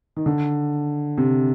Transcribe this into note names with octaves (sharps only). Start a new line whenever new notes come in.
D#3
D3
C3